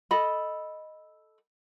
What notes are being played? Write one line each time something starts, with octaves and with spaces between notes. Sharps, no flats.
A4 D#5 B5